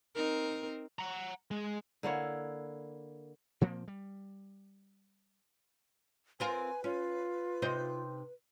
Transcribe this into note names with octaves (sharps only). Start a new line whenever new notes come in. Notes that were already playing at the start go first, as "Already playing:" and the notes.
C4 D#4 A#4
F#5 A#5
G#3
D3 A#3 E4 C#5
A#2 F3 A#3 C4
G3
C4 F4 A#4 B4 G#5
C#4 F4
C3 D#4 C5